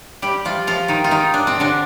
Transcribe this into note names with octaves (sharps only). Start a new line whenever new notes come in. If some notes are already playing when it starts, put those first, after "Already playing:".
G3 G4
F3 F4
F3 F4
D#3 D#4
F4
D#3 D#4
D4
C4
D3 D4